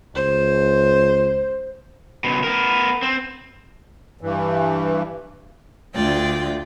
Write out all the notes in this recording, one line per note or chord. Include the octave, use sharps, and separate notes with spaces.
C#2 C5
C#2 B2
B3 A#4
C4
G2 E3
D2 A3 F4 D5 G5